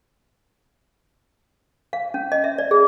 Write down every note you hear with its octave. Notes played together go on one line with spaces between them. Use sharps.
F5
C#4
D#5
E5
D5
G#4